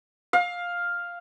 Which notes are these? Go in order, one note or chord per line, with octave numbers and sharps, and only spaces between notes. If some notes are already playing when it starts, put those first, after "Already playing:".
F5